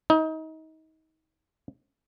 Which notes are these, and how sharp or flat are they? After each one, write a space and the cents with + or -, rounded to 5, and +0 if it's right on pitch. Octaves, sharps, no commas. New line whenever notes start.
D#4 +30